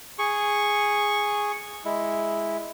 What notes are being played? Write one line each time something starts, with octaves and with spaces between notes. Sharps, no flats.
G#4 C#6
G#3 E4